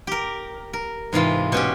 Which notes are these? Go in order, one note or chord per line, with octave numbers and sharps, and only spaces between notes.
G4 A#4
A#4
G#2 C3 E3 F4
B2 C#4 G4